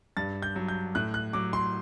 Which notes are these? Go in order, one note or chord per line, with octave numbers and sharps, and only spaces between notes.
G2 A6
G6
F#3
G6
A2 F#6
F#6
F#3 D6
C6